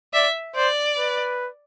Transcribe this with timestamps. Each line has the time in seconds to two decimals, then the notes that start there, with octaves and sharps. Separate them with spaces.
0.13 D5 E5
0.56 C5 D5
0.98 B4